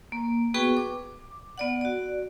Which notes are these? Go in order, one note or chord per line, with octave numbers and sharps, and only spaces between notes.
A#3
B3 F#4 G#4 B4 G5 C#6
D6
B3 D5 F#5
F#4 D5